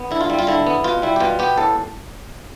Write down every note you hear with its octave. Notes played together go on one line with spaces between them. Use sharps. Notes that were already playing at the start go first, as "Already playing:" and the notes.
Already playing: B3
D3 E4
F4
G3 E4
F4
D3 E4
B3
B2 F4
G3 E4
G4
B2 F4
B3 G4
A2 A4